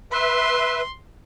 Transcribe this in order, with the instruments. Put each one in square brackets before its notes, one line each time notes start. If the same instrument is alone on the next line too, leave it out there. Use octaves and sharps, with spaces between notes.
[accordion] B4 E5 [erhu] C6